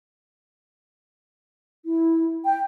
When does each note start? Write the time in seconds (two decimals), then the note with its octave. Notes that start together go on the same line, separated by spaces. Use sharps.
1.85 E4
2.45 G5